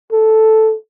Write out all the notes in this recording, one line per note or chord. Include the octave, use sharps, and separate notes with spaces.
A4